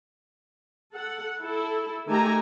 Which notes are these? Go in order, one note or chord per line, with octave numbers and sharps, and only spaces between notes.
A4 F#5
E4 A4
D#3 A3 G4 G#5 A#5